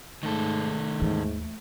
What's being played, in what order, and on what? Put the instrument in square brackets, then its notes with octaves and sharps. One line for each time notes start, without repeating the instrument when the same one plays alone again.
[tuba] G#2 [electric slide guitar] D#3 A4 [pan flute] A3
[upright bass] D#2 E3 [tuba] G#2